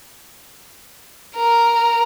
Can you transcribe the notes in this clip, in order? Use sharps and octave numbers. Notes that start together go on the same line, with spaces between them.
A#4